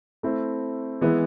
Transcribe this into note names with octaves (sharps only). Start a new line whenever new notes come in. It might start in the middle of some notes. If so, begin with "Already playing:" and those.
A3 C4 E4
E3 G#3 B3 E4